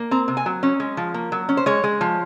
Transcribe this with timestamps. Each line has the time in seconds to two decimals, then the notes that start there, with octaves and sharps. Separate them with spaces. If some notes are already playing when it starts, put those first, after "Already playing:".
Already playing: A#3
0.11 C4 A#5
0.28 C3
0.37 G#5
0.46 F#3
0.63 C#4
0.80 G#3
0.97 F3
1.14 A#3
1.32 F#3
1.49 C#4
1.57 C5
1.66 G#3 C#5
1.84 G#3
2.01 F3